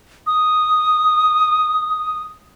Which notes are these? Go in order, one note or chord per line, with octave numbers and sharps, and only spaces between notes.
D#6